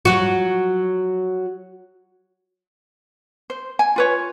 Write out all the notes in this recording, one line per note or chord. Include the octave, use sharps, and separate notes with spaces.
F#3 F#4
C5
G#5
F4 B4 C#5